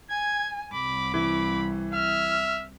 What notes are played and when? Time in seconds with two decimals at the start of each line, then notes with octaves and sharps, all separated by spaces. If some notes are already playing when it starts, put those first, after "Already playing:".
0.10 G#5 G#6
0.73 C2 B5 D6
1.14 E3 B5
1.93 E5 F6